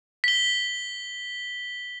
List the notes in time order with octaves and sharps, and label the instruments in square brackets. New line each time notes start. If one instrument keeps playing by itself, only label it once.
[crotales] B6 G7